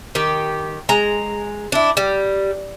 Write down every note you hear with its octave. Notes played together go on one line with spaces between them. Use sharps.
D#3 G4
G#3 A#5
D4 E4
G3